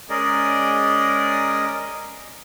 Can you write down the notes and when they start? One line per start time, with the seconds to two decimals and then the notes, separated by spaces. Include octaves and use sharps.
0.10 G#3 C#4 G#4 A#4 D5 D#5